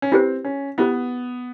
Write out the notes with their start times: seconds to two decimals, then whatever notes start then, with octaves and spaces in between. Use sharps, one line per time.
0.02 C#4
0.12 C4 E4 G4 B4
0.45 C#4
0.78 B3 E4 G4 B4